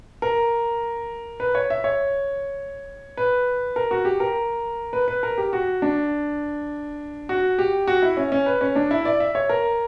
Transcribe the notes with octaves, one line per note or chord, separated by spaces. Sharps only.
A#4
B4
C#5
E5
C#5
B4
A#4
F#4
G4
A#4
B4
B4
A#4
G4
F#4
D4
F#4
G4
F#4
E4
C#4
C#4
B4
C#4
D4
E4
D5
E5
C#5
A#4